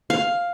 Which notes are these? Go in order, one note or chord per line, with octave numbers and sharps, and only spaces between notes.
F5